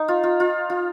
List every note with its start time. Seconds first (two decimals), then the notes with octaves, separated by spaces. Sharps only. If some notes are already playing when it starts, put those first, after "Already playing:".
Already playing: D#4
0.08 F4
0.23 F4
0.40 F4
0.70 F4